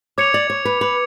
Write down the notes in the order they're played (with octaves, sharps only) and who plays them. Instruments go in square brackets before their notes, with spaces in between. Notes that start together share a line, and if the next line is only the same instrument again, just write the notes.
[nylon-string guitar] C#5 [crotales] D6 G#6 C#7 F7
[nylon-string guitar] D5
C#5
B4
B4